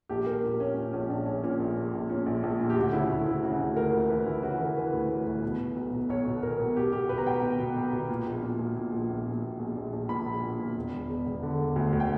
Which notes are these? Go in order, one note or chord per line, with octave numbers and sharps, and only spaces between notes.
A#1 G4
A#1 A#4
A#2 G4
A#2 C#4
A#2 C#4
A#1 C#4
A#1 D4
A#1 C#4
A#2 C#4
A#1
A#1
A#1
A#2 C#4
A#1
A#1
A#2
G4
D2
F#4
C#3 E4
D2
D2 E4
C#3 F#4
D2
D2 A#4
D2
E3 B4
D2 E4
C#3 F#4
E3 A#4
E3 B4
D2
D2
D2
B2
B2
B1
B2
B1 C#5
B2
B2 A#4
B1
B2 G4
B1 G4
B2 B4
A#5
B1 G5
B2
B2
B1
B2
A#2
A#1
A#2
A#2
A#2
A#1
A#1
A#2
A#2
A#1
A#1
A#1
A#2 B5
A#1
A#1
A#2
E1
E1
E1
E1
D3
E1
D2
D2
G5